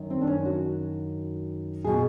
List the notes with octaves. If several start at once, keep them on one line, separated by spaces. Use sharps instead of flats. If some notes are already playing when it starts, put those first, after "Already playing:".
Already playing: F#2 D#3
C4
D4
C#4
F#4
B2 G#4